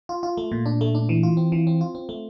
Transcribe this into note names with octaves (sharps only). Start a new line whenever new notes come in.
F4
F4
A3
A#2
D4
A3
D4
E3
F4
C4
E3
C4
F4
C4
A3